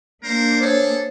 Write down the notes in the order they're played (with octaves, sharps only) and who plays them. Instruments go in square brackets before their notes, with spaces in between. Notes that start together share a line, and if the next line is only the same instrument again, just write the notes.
[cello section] A#3 D4 [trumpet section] A#4 C5
[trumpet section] G#4 A4 [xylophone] C5 C#5